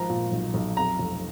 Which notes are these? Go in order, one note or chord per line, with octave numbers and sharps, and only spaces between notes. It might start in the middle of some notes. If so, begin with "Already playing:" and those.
Already playing: G#1 F3 A#5
A#2
B1
B1
F2 A#5
F1